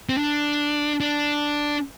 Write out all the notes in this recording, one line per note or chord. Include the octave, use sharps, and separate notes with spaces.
C4
D4
D4